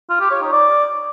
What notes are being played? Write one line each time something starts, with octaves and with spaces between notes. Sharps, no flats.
F4
G4
C#5
D#4
D5